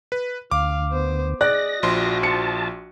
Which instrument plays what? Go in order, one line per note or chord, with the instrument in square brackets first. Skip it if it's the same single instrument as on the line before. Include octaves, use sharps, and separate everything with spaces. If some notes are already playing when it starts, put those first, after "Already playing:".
[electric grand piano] B4
[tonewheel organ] D2 [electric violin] F5 [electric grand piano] D6
[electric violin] B3 C5
[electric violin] G#4 D#5 [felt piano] D5 F#6 [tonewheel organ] A#6
[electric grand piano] A#1 F3 C6 [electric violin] F#4
[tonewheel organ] A5 [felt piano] C#7